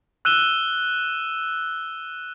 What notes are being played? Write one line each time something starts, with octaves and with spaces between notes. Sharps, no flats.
E6 F#6 D#7 E7 G7